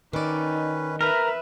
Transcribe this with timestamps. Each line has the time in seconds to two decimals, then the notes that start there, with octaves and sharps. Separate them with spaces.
0.13 D#3 C#4 D#4 B4 D5
1.01 A#4 B4 E5